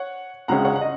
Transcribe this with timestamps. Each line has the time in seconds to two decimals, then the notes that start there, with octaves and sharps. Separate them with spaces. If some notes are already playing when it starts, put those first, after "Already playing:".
Already playing: C#5 F#5
0.48 C#2 C#3 G#3 C#4 F#5 A#5
0.65 C#5 F#5
0.76 F#5
0.81 D#5